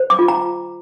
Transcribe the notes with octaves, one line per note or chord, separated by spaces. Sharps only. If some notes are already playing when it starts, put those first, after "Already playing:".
Already playing: C5
D6
F4
A#5